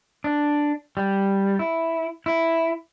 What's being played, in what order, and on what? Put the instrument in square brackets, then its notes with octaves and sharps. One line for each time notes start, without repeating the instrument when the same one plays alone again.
[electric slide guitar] D4
G3
E4
E4